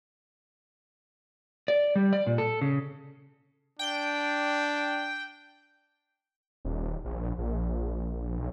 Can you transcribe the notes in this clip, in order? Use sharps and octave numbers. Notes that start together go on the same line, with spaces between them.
D5
G3
D5
A#2
A4
C#3
D4 G5
D#1
A#1
A#1
B1